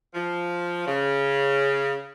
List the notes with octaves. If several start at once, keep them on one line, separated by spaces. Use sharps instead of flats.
F3
C#3